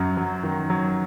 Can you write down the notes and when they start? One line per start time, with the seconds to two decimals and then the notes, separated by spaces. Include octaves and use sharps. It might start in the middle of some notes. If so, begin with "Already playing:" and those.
Already playing: F#2 F#3
0.17 F#3
0.43 D#3
0.70 F#3